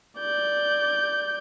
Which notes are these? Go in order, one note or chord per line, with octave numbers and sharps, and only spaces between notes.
D5 G6